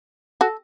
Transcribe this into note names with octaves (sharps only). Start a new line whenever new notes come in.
F#4 A4